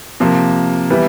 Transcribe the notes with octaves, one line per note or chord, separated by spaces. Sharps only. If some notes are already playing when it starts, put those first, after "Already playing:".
C3 F3 A#3
E3 G3 B3 E4